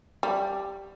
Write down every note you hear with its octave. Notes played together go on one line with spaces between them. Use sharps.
G3